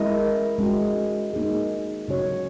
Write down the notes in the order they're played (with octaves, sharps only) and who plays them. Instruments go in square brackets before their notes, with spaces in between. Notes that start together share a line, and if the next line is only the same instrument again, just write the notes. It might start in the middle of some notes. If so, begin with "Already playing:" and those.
Already playing: [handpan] G#3 C#4 E4 A#4 D#5
G#3 C#4 F#4
A#3 D#4 G#4
C#3 F#3 C#4 F#4 C#5